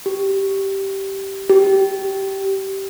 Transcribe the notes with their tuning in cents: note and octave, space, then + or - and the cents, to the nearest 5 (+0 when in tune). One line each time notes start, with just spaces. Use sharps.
G4 -10
G4 -15